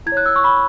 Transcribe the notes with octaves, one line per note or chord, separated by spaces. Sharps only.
E4 G#6
C#5
F#6
E6
C#6
B5